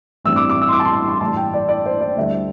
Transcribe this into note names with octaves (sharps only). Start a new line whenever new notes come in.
A1 G2 G3 C4 E6
D6
D6
E6
C6
D6
A5
C6
C6
A1 G2 G3 A5
G5
D5
D5
C5
D5
D2 D3 G3 E5